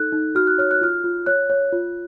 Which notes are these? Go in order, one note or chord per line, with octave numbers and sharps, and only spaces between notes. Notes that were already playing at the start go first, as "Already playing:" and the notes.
Already playing: D#4 A4 F#6
D#4
F#4 F6
F#6
C#5 F6
F#6
F4 F6
F4
C#5 F#6
C#5
F4